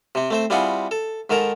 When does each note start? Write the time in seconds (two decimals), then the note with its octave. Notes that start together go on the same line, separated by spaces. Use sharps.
0.15 C3 C4
0.30 A3 C4 C5
0.50 G3 C4 E4 F4 G#4 F#5
0.91 A4
1.30 G#2 D#3 A4 A#4 A#5